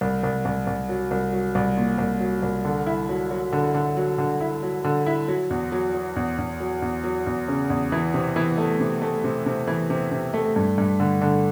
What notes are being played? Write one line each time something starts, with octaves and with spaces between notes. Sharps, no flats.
C2
C2
C2
C2
F#3
C2
F#3
C2
A#2
C2
F#3
C2
D3
E4
F#3
F#3
D3
D3
F#3
D3
E4
F#3
D3
E4
F#3
E2
F#3
F#3
E2
E2
F#3
E2
F#3
E2
C#3
E2
E3
C3
E3
A3
C3
A3
C3
C3
E3
C3
C3
A3
G2
G2
D3
D3